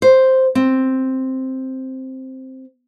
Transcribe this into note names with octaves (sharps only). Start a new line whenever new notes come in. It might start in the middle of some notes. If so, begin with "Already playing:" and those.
C5
C4